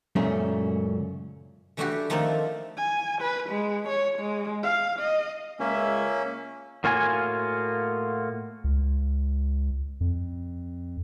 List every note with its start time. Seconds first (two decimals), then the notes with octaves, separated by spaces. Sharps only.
0.16 C#2 F#2 A#2 A3 C#4
1.77 E3 G3 A3 D4 F#4 G4
2.10 D#3 F3 A3 A#3 C4 A4
2.77 G#5
3.21 B4
3.50 G#3
3.88 C#5
4.19 G#3
4.63 F5
4.99 D#5
5.60 C#2 A#3 C#4 E5
6.84 A2 A#3 F4 F#4 G#5
8.64 C#2
10.01 F2